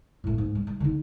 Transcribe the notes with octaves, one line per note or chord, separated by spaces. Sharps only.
A2 A3
G#2
G3
G3
D3 D#4